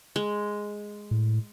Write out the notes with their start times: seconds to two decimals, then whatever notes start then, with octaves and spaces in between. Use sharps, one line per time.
0.16 G#3
1.11 A2